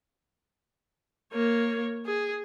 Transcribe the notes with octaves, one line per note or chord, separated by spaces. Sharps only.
A#3 C#5
G#4